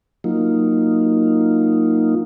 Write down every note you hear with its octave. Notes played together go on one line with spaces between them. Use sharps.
F#3 A#3 D#4 F4